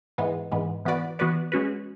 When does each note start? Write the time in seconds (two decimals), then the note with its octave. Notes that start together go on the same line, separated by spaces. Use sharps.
0.18 G#2 E3 G#3 B3
0.52 G#2 E3 G#3 B3
0.85 E3 B3 F#4 B4 D5
1.19 E3 B3 F#4 B4 D5
1.52 G#3 C#4 F#4 B4